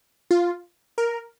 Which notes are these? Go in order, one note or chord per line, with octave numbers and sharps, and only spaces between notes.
F4
A#4